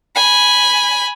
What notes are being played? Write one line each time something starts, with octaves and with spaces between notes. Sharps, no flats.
G#5 B5